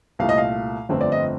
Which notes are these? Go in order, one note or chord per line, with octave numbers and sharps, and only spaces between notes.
C2 A#2 A3 F5
D#5
F5
G1 F2 D3 A3 C4
D5
D#5